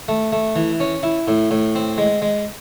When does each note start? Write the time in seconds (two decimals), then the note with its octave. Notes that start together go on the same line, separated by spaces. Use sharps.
0.08 A3
0.32 A3
0.56 E3
0.80 C#4
1.03 E4
1.28 A2
1.51 A2
1.75 C4
1.98 G#3
2.22 G#3